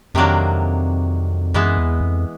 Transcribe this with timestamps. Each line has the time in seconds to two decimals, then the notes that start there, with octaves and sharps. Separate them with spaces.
0.14 F2 C3 D#3 F#3 A#3 D4
1.54 F#2 E3 G#3 B3 E4
1.77 E2
2.01 F2